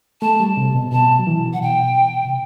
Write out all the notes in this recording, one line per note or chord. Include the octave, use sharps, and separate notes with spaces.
A3 A5
G3
C3
B2
B2 A5
F#3
E3
F#5
B2 G5
C3